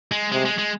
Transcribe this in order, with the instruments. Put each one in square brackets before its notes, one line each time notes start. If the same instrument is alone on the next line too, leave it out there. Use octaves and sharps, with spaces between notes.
[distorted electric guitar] G#3
[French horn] C3 [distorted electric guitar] G#3
[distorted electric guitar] G#3
G#3